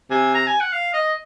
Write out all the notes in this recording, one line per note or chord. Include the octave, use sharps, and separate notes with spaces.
C3 G#5
A#5
G#5
F#5
F5
D#5